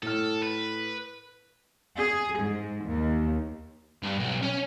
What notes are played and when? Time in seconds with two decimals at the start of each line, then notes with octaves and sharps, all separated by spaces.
0.03 A2 A4 F6
0.43 B4
1.98 G#4
2.41 G#2
2.86 D#2
4.03 G2
4.19 B1
4.43 C#4